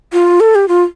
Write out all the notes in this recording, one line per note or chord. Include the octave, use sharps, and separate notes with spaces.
F4
A4
G4
F4